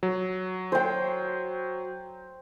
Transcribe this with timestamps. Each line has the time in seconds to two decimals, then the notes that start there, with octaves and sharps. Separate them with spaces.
0.03 F#3
0.72 C5 G5